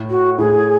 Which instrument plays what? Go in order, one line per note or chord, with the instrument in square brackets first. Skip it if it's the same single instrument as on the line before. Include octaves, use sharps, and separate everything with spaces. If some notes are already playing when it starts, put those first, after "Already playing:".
Already playing: [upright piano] A2
[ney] F#4
[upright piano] A2 [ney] G#4